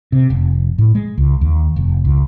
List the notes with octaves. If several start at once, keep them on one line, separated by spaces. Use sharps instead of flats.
C3
F1
A2
G#3
C#2
D#2
F1
C#2